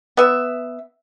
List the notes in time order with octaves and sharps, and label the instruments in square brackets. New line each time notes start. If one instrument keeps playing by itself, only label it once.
[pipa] B3 E5